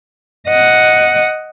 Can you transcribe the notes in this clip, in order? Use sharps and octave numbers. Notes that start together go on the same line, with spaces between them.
D#5 F#5